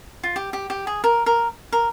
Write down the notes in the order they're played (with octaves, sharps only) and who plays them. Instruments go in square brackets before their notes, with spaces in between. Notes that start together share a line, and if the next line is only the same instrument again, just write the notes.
[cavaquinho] F4
G4
G4
G4
G#4
A#4
A#4
A#4